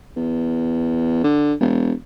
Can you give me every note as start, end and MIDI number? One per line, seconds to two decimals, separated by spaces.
0.16 1.21 40
1.24 1.53 50
1.60 1.93 28